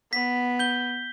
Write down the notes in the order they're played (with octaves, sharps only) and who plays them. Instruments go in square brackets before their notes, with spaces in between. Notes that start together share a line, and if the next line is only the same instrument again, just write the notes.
[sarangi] B3 [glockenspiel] B6
[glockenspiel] G6 G7